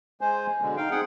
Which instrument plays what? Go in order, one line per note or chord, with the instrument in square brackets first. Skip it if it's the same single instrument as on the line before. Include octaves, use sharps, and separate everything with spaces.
[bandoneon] G#3 C5 [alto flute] G#5
[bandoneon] B2 D3 G#3
[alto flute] D#4 [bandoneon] F5 G5
[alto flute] C4 [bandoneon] G#4 F#5 G5